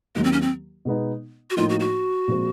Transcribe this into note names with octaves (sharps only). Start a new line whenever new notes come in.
D#2 D#3 F#3 G#3 A#3
C4
C#4
C4
B2 G#3 B3 D#4
F#4
A2 F3 A#3 D#4 F4
F#4
F#4
A#2 F3 G#3 C4